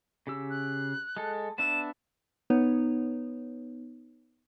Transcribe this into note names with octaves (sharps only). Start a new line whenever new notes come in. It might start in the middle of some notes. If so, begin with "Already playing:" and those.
C#3 G4 E6
F#6
G#3 A4
B3 D4 E5 E7
B3 D#4 B4 C#5